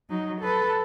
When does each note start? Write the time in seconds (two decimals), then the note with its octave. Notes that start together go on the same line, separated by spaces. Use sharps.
0.10 F#3 D#4
0.41 A4 B4